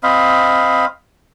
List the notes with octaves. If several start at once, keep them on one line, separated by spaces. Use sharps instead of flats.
C4 D#5 F5 B5